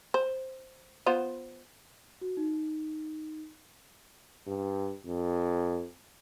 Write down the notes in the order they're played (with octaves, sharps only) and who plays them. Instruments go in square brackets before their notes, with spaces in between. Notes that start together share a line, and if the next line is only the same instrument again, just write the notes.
[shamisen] C5
B3 F4 C5
[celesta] F#4
D#4
[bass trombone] G2
F2